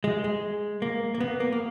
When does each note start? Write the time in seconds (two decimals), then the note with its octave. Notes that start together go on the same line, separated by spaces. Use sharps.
0.04 G#3
0.24 G#3
0.82 A#3
1.14 A#3
1.20 B3
1.40 A#3
1.52 A#3